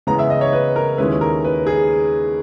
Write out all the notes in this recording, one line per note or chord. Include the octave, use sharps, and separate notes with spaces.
C#3 E3 G#3 B3 A#5
E5
D#5
C#5
B4
A#4
D#2 D#3 G#3 C#4 E4 B4
A#4
B4
G#4